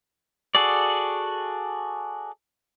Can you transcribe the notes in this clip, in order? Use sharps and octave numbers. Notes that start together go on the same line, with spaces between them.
F#4 G#4 A4 D5